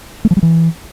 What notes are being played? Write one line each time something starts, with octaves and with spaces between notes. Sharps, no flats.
A3
F3
G3
E3